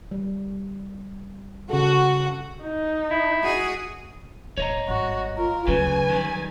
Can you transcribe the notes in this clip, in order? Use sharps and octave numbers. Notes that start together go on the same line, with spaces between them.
G3
C#3 F#4 G#4 A4
D#4
E4
F#4 G#4
D1 C#5 D#5 A#5
G#1 G2 F#4
F4 A#4
D2 C#3 F#3 B4 G#5
D#3 G3